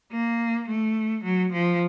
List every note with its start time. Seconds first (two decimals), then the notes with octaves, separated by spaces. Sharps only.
0.12 A#3
0.68 A3
1.24 F#3
1.52 F3